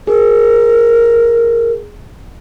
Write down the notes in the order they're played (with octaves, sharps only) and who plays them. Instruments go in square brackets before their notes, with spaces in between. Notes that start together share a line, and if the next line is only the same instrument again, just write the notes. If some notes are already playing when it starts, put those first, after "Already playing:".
[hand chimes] G#4 [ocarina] A#4